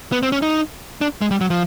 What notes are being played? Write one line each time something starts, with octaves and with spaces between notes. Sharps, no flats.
B3
C4
C#4
D#4
D4
G#3
G3
F#3
F3